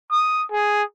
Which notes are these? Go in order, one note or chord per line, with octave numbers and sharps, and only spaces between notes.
D#6
G#4